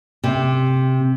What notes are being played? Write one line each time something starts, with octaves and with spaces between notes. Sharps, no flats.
C3